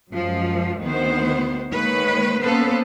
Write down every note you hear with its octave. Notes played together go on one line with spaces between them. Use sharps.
F#2 F3 G#3
D2 D#3 B3 C5
D#3 G#3 A#3 B4 C#5
A#3 B3 C#4 A4 B4 C5